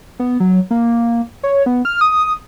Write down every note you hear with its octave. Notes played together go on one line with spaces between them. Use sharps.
B3
F#3
A#3
C#5
B3
F6
D#6